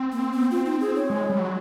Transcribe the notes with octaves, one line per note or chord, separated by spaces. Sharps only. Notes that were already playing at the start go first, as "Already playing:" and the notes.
Already playing: C4
A#3
B3
F4
D#4
G#4
C#5
G#3
G3
F#3